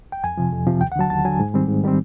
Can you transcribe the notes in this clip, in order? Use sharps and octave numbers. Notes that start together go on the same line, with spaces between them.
G5
F2 G#5
C3 F3
F2
C3 F3
D#2 G5
F#5
D3 F#3 A5
D#2 A5
D3 F#3 G#5
G#2
D#3 G3 C4
G#2
D#3 G3 C4